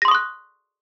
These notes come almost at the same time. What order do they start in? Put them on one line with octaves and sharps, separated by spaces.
A#6 C6 D#6 C#6 F#6